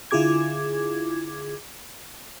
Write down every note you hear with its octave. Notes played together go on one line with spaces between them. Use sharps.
D3 E4 F4 G#4 D6 G#6